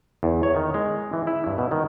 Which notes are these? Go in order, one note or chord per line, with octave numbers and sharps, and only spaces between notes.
E2
C#5
D#3
G#3
E3
E4
G2
B2
D#3